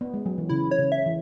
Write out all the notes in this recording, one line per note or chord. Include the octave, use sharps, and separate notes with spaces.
B3
G#3
F#3
E3
C#3 E4
C#5
C#3
E5
E3